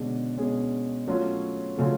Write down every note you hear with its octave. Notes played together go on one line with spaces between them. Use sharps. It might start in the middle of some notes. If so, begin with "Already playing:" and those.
Already playing: B2 D3 G#3 C#4 G#4
B2 G#3 C#4 G#4
F#3 A3 C#4 F4
C#3 F#3 A3 C#4 F4